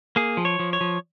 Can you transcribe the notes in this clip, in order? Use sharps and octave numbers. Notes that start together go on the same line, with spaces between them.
A#3 G#4
F3
C#5
F3
C#5
F3